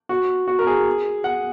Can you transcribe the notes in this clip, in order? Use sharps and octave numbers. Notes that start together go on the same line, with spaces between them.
F#4
F#4
A#4
G#4
F#5